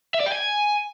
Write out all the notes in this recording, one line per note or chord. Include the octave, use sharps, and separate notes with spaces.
E5
D5
G5
G#5